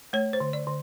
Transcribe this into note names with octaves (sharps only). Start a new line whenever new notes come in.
A3 C#5
C5
D3
D5
D3